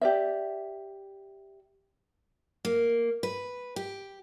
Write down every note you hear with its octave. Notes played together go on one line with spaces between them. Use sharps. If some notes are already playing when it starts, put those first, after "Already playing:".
G4 D5 E5
A#3
B4
G4